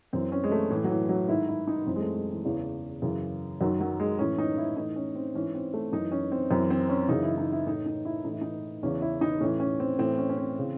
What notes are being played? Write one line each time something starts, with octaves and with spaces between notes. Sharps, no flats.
F#2 E3 C4
C#4
G#3
A3
A2 E3
F#3
E3
F#3
G#2 D#3 E4
E4
D#4
F#2 E3 C4
G#3
A3
G#3
E3
E2 C#3 E3
F#2 C#3 E3
F#2 D#3 F#3
F#3
G#3
A2 E3 C#4
D#4
E4
A2 E3 D#4
C#4
C4
G#2 E3 C#4
C4
A3
F#2 E3 D#4
C#4
C4
F#2 E3 C4
C4
C#4
F#2 C#3 E3 D#4
E4
D#4
E4
A2 E3 D#4
D#4
E4
A2 E3 D#4
E4
D#4
E2 C#3 E3 C#4
E4
D#4
A2 E3 C#4
C#4
C4
A2 E3 C4
C#4
C#4
C4
C#3 E3